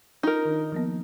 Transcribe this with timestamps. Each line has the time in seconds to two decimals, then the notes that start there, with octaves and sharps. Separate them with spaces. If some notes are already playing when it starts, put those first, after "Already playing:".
0.23 D#4 F4 A#4 D#5
0.45 D#3 D4 D#5
0.72 F3 A#3 B3